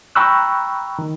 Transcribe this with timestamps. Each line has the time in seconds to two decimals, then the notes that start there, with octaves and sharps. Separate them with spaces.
0.15 G5 A#5 B5 C#6 E6 F#6
0.99 D#3